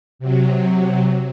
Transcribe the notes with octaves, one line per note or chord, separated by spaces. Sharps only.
C3 F#3